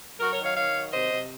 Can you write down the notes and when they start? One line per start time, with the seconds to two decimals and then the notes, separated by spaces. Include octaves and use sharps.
0.20 F#3 F#4 A#4
0.32 A#4 C#5
0.38 D#3
0.44 C#5 F5
0.56 D#3 C#5 F5
0.75 F#3
0.93 C3 C5 D#5
1.12 C3